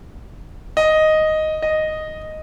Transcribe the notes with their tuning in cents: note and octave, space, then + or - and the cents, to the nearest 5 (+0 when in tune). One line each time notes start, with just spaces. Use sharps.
D#5 +0
D#5 -5